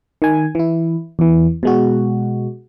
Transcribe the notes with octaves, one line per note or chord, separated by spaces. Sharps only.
D#3 G#5
E3 E4
E2 E3
B2 G#3 F#4